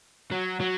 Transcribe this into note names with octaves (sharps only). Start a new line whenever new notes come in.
F#3
F#3